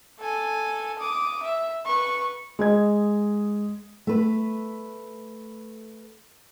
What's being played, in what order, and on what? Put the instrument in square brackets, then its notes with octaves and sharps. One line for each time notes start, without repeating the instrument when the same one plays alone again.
[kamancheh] A4 G#5
D6 D#6
E5
B4 C#6
[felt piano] G#3 D#5 G#6
[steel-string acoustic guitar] A3 B4